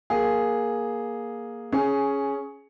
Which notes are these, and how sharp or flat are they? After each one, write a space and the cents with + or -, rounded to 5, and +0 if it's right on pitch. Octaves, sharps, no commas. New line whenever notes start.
A#3 +10 G#4 +0
C#4 +0 G#4 +10